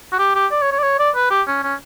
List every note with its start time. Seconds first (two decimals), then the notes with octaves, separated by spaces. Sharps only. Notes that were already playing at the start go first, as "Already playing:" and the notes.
0.13 F#4
0.19 G4
0.35 G4
0.52 D5
0.62 C#5
0.72 C#5
0.79 D5
0.83 C#5
0.99 D5
1.15 B4
1.30 G4
1.47 C#4
1.63 C#4